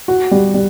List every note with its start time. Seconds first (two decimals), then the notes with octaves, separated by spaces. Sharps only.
0.08 F#4
0.31 G3
0.54 G3